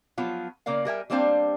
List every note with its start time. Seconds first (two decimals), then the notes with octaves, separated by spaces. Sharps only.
0.18 F3 F#3 B3 F4
0.66 C#3 A#3 A#4 D5 F5
0.85 G3 A#4 E5 G#5
1.10 G3 A#3 C4 D4 C5 F5